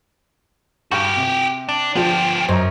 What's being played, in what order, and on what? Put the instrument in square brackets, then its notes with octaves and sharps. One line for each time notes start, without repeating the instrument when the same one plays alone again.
[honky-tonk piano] G2 C#6 [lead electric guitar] F#4 G4 [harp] G5
[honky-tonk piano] C3
[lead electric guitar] D4
[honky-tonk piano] F3 D4 F4 [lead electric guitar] B3 G4
[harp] F#2 [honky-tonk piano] C5 D#5 A#5